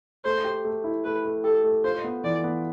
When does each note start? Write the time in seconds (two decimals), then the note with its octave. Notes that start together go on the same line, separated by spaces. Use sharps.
0.24 A3 C5
0.44 G4
0.65 A3
0.84 E4
1.05 A3 B4
1.25 A3
1.44 G4 A4
1.64 A3
1.84 F4 C5
2.04 B3
2.24 E3 D5
2.44 B3